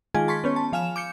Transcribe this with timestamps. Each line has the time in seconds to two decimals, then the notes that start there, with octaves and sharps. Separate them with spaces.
0.14 D#3 G#3 F4 G#4 G#6
0.28 A5 C6 C#6 B6
0.44 B3 C#4 C#5
0.56 A5
0.73 F3 F5 G#5 F6 E7
0.96 D6 G6 C#7